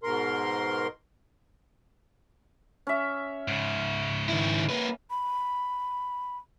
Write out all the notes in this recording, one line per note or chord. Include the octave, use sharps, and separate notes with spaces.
G#2 B2 A#4 C6
C#4 E5
G#2 C#3
D#3 E4
A#3 B4
B5